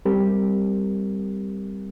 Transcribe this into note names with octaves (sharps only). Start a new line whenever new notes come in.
G3 C4 G4 A#4